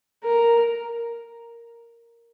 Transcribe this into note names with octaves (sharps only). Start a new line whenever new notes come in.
A#4